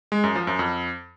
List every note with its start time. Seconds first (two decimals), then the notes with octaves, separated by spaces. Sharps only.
0.12 G#3
0.24 F#2
0.35 F3
0.47 F#2
0.59 F2